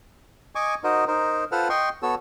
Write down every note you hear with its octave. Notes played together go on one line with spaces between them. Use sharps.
D#5 G#5 C#6 D6
D#4 F#4 A#4 C5 D#5
D#4 A#4 C5
F4 A4 B4 C5 F#5 F6
D#5 G5 C6 C#6
B3 F#4 A4 C#5 E6